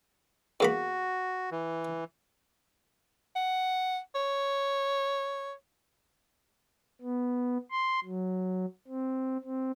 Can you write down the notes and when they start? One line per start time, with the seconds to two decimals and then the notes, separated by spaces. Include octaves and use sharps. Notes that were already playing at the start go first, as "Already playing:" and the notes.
0.60 E2 A#3 F#4 B5
1.51 E3
3.36 F#5
4.15 C#5
7.01 B3
7.71 C6
8.04 F#3
8.87 C4
9.44 C4